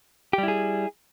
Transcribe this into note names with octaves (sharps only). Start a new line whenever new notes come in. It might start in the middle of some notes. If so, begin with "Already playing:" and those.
G3 E4 G4 G#4